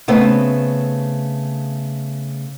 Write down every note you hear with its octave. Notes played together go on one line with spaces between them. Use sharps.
C#3 A3 B3 C4